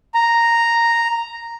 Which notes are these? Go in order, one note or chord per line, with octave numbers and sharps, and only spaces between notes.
A#5